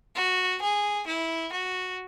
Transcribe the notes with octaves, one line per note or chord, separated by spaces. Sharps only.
F#4
G#4
E4
F#4